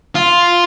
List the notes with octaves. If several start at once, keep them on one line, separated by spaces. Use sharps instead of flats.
F4